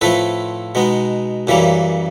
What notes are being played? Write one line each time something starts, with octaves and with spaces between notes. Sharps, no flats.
A2 F3 A3 C4 A4 B4
B2 G#3 B3 D#4
F#2 C#3 E3 G3 A#3